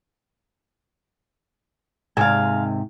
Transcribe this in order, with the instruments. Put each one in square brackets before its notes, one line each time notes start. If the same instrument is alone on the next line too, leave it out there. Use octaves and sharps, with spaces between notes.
[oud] D#2 G#2 C3 [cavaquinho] F5 G#5